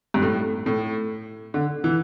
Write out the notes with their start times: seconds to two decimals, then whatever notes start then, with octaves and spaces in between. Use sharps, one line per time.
0.14 G2
0.22 A2
0.66 A2
1.54 D3
1.84 E3